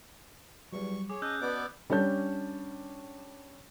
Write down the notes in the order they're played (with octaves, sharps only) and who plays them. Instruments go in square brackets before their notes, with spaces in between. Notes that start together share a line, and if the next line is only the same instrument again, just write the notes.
[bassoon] E2 [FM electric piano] F#3 G3 [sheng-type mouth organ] C#6
[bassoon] G#4 [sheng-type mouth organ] C#5 [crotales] D6
[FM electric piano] C#4 A5 [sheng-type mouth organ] D#5 [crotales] E6 F#6 G6
[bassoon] B2 [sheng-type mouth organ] B3 D5 D6
[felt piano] G3 C#4 D4 C#5 A5 G6